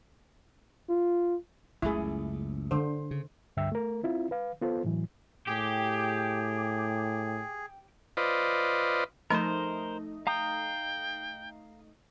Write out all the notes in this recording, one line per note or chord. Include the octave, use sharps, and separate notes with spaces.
F4
F#1 C#2 A3 E4 G#4
D3 C5
C#3
C#2 G2 D3 E5 G5 E6
A3 A#4
C4 E4 F4
B4 F5
B3 F4 A4 C5
A2 E3 F#3
A2 G4 G#4
F4 B4 C5 D5 D#5
F3 A3 D#4 A#4 C5 D#5 C6
F5 G5 A#5 D#6